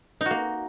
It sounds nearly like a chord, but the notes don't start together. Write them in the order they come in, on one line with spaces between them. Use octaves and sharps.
D#4 F#4 A#3